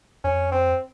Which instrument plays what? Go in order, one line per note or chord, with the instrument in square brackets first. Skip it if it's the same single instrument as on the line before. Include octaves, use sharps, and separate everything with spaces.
[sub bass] F2 [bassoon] C#4
[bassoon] C4